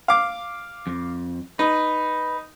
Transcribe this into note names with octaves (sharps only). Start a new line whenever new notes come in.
F5 D6
F2
D#4 B4